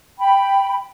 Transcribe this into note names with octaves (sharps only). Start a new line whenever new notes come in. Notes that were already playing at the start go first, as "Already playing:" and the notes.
G5 B5